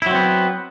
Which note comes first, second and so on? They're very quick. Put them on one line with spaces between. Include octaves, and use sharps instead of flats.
E4 F#3 C4 B3